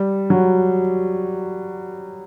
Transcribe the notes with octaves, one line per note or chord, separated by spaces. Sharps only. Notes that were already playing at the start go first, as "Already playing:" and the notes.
Already playing: G3
F#3